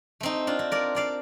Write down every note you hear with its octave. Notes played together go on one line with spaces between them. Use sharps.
A3 C4 D#4
D4 F4
C4
A#4 D5
C4 D5 F5